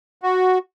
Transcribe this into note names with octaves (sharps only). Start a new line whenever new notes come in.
F#4